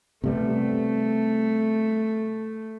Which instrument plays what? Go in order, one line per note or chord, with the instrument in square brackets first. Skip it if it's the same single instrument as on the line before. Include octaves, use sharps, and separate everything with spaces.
[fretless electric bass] C3 G3 B3 [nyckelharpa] A3